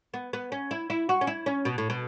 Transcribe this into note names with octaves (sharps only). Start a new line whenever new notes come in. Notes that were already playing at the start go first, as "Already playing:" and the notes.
B3
B3
C#4
E4
E4
F#4
C#4
E4
C#4
B2
A2
B2